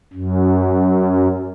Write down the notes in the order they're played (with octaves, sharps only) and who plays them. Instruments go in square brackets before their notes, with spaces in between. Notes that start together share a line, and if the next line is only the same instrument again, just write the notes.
[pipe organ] F#2